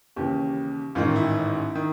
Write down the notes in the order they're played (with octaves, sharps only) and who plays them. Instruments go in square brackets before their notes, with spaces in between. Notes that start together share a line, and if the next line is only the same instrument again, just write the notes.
[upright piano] D#2 C#3 E3 G4
A1 G#2 D#3 F4
E4
D#3